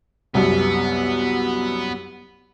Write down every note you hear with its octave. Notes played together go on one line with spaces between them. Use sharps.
C2 F#2 B3